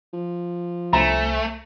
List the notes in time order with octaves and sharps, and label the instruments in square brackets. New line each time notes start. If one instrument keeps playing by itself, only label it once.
[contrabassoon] F3
[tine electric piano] C2 C5 G#5 [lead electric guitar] A3 [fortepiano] A#5